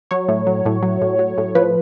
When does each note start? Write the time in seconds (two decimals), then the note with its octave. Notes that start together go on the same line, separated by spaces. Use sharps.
0.11 F#3 C#5
0.28 A2
0.47 F#3
0.66 A2
0.83 F#3
1.02 A2
1.19 F#3
1.38 A2
1.55 F3 B4